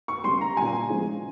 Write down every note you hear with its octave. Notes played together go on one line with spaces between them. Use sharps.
C#6
C#3 G3 C6
A#5
A#2 G3 G#5
C#3 F3 G#3